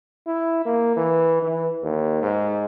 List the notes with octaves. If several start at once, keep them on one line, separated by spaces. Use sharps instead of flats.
E4
A#3
E3
E3
D#2
G#2